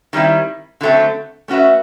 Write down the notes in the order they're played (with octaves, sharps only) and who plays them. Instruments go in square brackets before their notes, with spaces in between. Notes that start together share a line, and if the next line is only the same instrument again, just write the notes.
[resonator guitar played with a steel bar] D#3 G3 C4 E4
D3 F#3 A3 C4
A3 C#4 F#4 B4 E5